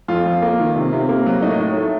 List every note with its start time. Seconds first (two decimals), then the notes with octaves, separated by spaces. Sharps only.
0.08 F2 F4
0.26 F2
0.42 A#3
0.59 D#3
0.75 C3
0.93 C3
1.09 A#3
1.26 F#3
1.42 A2 D#4
1.60 A2
1.76 A3